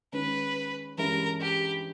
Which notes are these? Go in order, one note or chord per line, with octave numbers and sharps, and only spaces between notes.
D#3 G#3 C#4 B4
G2 E3 G#3 C#4 E4 A#4
G4